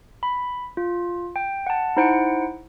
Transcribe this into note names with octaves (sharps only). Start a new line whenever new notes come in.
B5
F4
G5
F#5 A5
D#4 E4 C5 F#5 C#7 D7